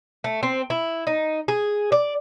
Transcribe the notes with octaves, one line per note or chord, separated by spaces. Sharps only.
A3
C4
E4
D#4
G#4
D5